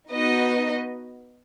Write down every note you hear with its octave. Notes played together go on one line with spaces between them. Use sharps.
B3 D#4 F#4 B4 D#5